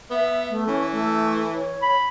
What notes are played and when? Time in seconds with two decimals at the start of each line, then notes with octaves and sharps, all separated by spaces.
0.11 B3 E5
0.49 A3
0.68 E3 C#4
0.92 A3
1.54 C#5
1.82 B5